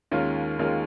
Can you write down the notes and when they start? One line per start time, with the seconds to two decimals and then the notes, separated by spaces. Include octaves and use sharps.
0.11 D#2 D#3 G#3 C#4 F4
0.59 D#2 D#3 G#3 C#4 F4